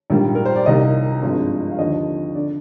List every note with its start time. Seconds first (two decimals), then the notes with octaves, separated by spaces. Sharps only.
0.10 A#1 G#2 G3 A#3
0.35 A#4
0.45 C5
0.56 D5
0.66 C2 C3 D#3 A#3 D#5
1.22 G#1 G2 F3 G#3
1.71 F5
1.79 D#2 D3 F3 D#5
2.35 D3 D5